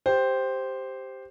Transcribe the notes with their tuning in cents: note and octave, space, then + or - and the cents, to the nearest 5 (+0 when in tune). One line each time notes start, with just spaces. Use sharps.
G4 +0 C5 +0 G5 +0